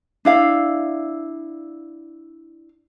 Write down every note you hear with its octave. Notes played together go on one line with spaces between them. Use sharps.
D4 E4 F5